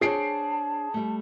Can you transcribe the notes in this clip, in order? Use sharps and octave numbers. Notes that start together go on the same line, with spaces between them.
D4 G#4 C5 C#5 A5 C7 D7
G3 A3